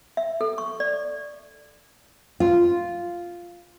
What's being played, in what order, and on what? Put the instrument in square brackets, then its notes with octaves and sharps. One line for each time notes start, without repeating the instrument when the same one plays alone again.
[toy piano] E5
A4
C#6
D5
[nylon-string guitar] F4